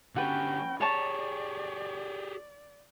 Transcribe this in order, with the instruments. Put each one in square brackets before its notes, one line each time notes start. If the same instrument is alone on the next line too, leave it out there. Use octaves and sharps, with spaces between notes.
[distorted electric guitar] D3 G3 [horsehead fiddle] C#4 G5 [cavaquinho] F#4 B4
[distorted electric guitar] G4 G#4 [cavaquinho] C#5 A5 A#5 [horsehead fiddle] D5